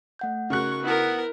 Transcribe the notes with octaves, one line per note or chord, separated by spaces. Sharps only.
A3 F#5 G6
C#3 D#4 F#4 A#4 C#6 F#6
B3 E4 A#4